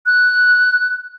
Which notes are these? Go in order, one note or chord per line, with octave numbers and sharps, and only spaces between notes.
F#6